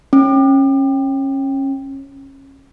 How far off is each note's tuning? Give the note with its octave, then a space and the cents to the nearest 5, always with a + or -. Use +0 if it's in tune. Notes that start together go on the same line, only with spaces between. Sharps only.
C#4 -25